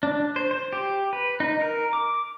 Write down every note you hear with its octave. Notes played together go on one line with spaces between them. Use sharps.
D4
C5
C5
G4
B4
D#4
A#4
D6